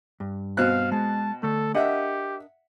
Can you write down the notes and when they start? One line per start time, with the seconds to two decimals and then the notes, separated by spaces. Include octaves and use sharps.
0.20 G2
0.57 B2 C4 F5 F#6
0.92 G#3 A5
1.43 D3 A3 A4
1.74 D4 G4 A#4 D#5 E5 F#5